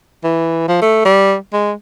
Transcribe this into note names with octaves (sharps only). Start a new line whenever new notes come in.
E3
F3
A3
G3
G#3